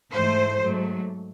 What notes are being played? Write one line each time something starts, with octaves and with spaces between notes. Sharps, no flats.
G#2 E3 A3 C5
G#2 F#3 A3